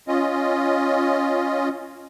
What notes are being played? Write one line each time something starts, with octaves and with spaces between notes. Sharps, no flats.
C#4 F4 D#5